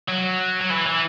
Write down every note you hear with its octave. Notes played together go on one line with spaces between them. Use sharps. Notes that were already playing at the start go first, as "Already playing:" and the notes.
F#3
F#3
E3
E3